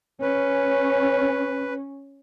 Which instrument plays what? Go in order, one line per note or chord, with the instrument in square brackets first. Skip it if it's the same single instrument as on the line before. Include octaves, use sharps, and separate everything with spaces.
[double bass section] C#4 [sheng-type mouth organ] B4